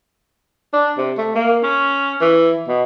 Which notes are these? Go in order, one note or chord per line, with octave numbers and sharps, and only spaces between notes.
D4
C3
A3
A#3
C#4
E3
B2